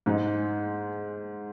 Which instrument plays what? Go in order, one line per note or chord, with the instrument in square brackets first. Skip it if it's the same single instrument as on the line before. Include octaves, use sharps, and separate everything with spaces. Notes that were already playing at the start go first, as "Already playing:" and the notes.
[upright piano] G#2 G#3 D#4